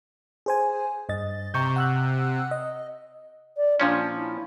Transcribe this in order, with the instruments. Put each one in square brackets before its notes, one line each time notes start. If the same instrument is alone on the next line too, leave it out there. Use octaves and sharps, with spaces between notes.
[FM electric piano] G#4 C5 G#5
G2 D#5 A6
[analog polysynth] C3 [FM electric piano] A#5 C#6 G6
[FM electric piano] F#5 E6 F#6
D#5
[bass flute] D5
[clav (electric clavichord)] A#2 F3 C#4 [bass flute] D4
[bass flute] E4